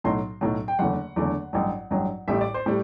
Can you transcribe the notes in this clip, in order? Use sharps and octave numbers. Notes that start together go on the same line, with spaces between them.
B1 A2 F#3 C6
B1 A2 F#3
G5
F#1 E2 D3 A3 F#5
F#1 E2 D3 A3
A1 G2 F#3
A1 G2 F#3
A1 A2 G3 E5
D5
C5
A2 G3